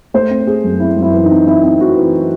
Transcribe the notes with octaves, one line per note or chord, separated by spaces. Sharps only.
A3 C5
C4
C4 G#4
F#2
C4 E4
F#2
E4
E3
D#4
C4
C4 E4
C4
C4 F#4
E3